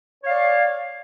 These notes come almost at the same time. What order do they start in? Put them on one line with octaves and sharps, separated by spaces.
C#5 F5 D5